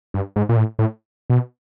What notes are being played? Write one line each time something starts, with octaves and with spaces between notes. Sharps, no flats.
G2
G#2
A#2
A2
A2
B2